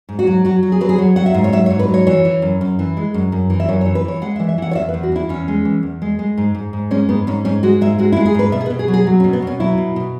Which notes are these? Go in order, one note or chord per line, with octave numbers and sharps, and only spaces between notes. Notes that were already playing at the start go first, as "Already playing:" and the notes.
G#2
F#4
F#3
F#3 F#4
F#3
G#4
F#3 B4
G#4
F#3 C#5
F#3 F#5
E5
G#2
C#5
F#3 E5
C#5
G#2
B4
F#3
C#5
E3 C#5
E3
F#2
F#2
E3
G#3
F#2
F#2
E3
E5
F#2 C#5
C#5
E3
B4
E3 C#5
G#3 F#5
E5
E3
E5
E3 F#5
C#5
E2 E5
B4
E2
F#4
E2 E4
E2 C#4
G#3
E3
E2
G#3
G#3
G#2
G#2
G#2
G#3 C#4
G#2 B3
G#2 C#4
G#2 C#4
G#3 F#4
G#2 E5
G#3 F#4
E4
G#3
G#4
G#2 B4
B2 E5
G#4
B4
B2
G#4
F#3
G#4
F#3
C#4
B2
B3
B2 C#4
F#3 E4
B2
B2